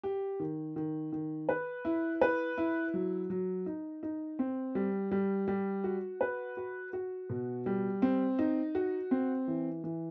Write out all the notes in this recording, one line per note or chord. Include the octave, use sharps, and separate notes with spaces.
G4
D#3
D#3
D#3
B4
E4
B4
E4
F#3
F#3
D#4
D#4
C4
G3
G3
G3
F#4
B4
F#4
F#4
B2
G3
C4
D#4
F#4
C4
E3
E3